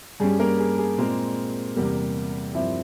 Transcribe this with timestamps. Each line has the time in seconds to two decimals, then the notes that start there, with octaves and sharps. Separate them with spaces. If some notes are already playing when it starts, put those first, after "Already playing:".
0.20 G2 G3 C#4 G#4
0.39 A#3 A#4
0.59 G#4
0.78 G#4
0.98 A#2 G#3 A#3 C4 A#4
1.76 E2 C3 G3 A#3
2.55 G2 F3 C4 E4 E5